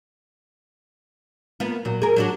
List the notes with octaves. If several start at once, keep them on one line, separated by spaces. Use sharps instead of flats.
A#3 B3 F4
A#2 F#3
G#4 A#4
F#3 D4 F#4